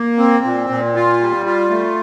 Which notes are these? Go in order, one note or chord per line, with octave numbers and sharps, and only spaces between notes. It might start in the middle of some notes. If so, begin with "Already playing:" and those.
Already playing: A#3
C4
A#2
A#2
F4
G3
F4
A3